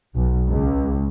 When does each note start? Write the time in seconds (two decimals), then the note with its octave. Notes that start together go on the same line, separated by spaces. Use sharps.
0.15 B1
0.48 C#2